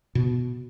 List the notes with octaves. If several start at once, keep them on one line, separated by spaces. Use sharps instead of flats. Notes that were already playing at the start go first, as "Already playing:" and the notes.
B2